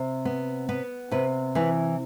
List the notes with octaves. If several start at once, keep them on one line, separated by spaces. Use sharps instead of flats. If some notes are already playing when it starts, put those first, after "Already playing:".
Already playing: C3
B3
B3 B4
C3 B4
E3 B4